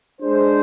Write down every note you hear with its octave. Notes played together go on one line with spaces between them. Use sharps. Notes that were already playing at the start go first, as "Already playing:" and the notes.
G#3 D4 G#4 C5